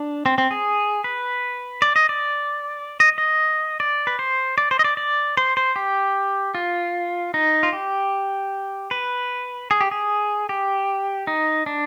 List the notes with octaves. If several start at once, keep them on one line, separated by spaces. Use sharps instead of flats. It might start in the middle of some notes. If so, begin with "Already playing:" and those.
Already playing: D4
C4
C4
G#4
B4
D5
D#5
D5
D#5
D#5
D5
B4
C5
D5
C5
D#5
D5
D5
C5
C5
G4
F4
D#4
F4
G4
B4
G#4
G4
G#4
G4
D#4
D4